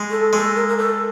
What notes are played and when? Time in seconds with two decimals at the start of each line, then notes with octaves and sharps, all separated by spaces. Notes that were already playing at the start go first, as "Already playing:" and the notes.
Already playing: G#3
0.11 A4
0.33 G#3 A4
0.55 A#4
0.68 A#4
0.77 A4